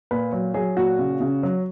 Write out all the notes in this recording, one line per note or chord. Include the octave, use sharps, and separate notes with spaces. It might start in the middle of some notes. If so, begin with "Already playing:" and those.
A#2 B4
F#3
F#3 G#4
A#2 F#4
C#3
C#3
F#3